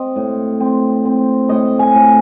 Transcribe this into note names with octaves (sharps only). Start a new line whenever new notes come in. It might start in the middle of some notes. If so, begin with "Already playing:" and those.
Already playing: C4 D#5
A2
C4
C4
A2 D#5
G#5
A2